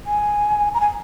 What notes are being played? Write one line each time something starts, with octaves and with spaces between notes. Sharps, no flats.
G#5
A#5
G#5